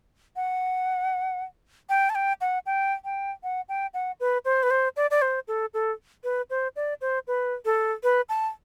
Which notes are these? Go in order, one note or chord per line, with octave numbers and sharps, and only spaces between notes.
F#5
G5
A5
G5
F#5
G5
G5
F#5
G5
F#5
B4
C5
B4
C5
D5
D5
C5
A4
A4
B4
C5
D5
C5
B4
A4
B4
A5